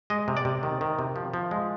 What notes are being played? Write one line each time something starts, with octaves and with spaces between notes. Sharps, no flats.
G#3 D#5
C3
D5
C3
D#3
D#3
C3
F3
F3
G#3